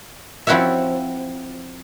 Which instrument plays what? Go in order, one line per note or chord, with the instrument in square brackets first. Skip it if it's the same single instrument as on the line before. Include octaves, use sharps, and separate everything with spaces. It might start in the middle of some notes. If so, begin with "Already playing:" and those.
[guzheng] F3 C4 E4 F#4 C#5 E5